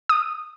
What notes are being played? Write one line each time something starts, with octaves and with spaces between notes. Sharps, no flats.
D#6